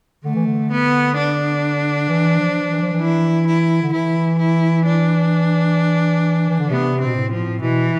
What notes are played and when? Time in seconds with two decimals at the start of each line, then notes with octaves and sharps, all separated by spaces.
0.24 D3 A3
0.35 E3
0.46 D3
0.71 B3
1.17 D4
2.09 E3
2.40 F3
2.71 E3
2.82 F3
2.94 E3
3.01 E4
3.47 E4
3.82 D3
3.93 E3 E4
4.39 E4
4.86 D4
6.50 E3
6.59 D3
6.69 C3 B3
7.00 C4
7.06 B2
7.16 A2
7.31 F3
7.61 B2 E3